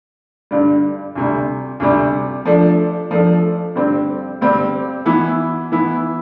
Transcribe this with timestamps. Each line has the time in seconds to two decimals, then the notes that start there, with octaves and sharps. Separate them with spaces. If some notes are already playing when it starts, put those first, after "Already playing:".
0.51 G2 D3 G3
1.16 D2 C3 G3
1.80 D2 C3 G3
2.45 F3 A3 D4 A4
3.11 F3 A3 D4 A4
3.75 G2 D3 G3 C4
4.41 G2 D3 G3 C4
5.06 E3 B3 E4
5.72 E3 B3 E4